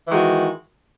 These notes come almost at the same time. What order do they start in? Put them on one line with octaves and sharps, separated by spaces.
E3 D#3 G#3 F#4